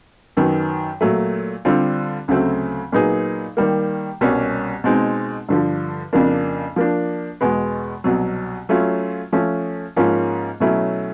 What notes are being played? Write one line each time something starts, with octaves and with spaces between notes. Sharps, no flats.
F#2 D#3 F#3 B3
A#2 F#3 A3
D3 G3 C4 F4
D2 C#3 F#3 A3 C4
A#2 F#3 B3 D#4 G#4
D#3 G3 A#3
C2 B2 G3 A#3 C#4
B2 G#3 C4 D#4
G2 D3 F3
F2 C#3 F3 A#3 D4
F3 A#3 D4
E2 B2 G#3 B3
C2 B2 F#3
F#3 A3 C#4 F4
F3 A3 C#4
G#2 F3 A#3 C#4 F4
B2 F#3 A3 C#4 E4